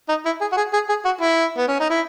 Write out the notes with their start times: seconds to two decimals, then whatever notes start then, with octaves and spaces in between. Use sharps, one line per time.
0.09 D#4
0.26 E4
0.41 G#4
0.52 F#4
0.57 G#4
0.73 G#4
0.89 G#4
1.05 F#4
1.21 E4
1.57 B3
1.68 C#4
1.80 D#4
1.90 E4